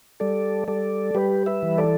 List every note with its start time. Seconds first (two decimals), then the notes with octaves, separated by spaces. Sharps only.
0.20 G3 A4 D5
0.68 G3 A4 D5
1.15 G3 G4 B4
1.46 B4 E5
1.63 E3
1.78 A4 D5